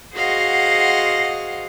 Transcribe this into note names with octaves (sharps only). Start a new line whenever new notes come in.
F#4 G#4 C5 D#5 F5 F#5